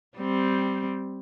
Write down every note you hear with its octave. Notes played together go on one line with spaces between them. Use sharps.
G3 C4